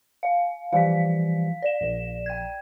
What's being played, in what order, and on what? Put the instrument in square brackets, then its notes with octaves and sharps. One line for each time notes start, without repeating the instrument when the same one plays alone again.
[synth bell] F5
[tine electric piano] E3 F3 G3 [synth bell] F5 B6
[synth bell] D5 E7
[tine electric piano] A#1
[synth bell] G5 G#6